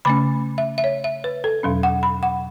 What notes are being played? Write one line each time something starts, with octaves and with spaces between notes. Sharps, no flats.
C#3 A3 C#4 B5
E5
E5
C#5
E5
B4
A4
E2 B2 F#3 C#4
F#5
B5
F#5